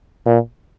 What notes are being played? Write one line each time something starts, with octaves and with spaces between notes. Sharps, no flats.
A#2